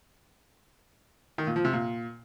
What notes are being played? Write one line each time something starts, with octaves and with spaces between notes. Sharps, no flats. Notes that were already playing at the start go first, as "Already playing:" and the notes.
D#3
A#2
F3
C3
A#2